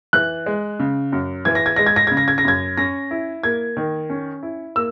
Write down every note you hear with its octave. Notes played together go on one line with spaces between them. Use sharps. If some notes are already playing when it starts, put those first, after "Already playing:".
E3 F#6
G#3
C#3
F#2
E3 G#6
A#6
G#6
G#3 A#6
G#6
A#6
C#3 G#6
A#6
G#6
A#6
F#2 G#6
C#4 A#6
E4
A#3 G#6
D#3
C#4
E4
A#3 E6